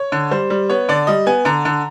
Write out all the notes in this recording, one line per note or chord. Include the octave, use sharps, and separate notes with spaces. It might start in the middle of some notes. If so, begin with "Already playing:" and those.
Already playing: C#5
D3
G3 C5
G3
B3 C#5
D3 D5
G3 D#5
B3 G#5
D3 A#5
D3